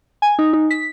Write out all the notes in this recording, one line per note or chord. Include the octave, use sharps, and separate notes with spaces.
G#5
D#4
D#4
B6